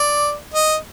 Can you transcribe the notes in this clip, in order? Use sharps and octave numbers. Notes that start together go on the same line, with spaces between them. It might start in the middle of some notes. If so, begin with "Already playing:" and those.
Already playing: D5
D#5